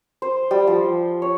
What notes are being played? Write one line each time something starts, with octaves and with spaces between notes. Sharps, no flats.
C5
G3
F3
C#5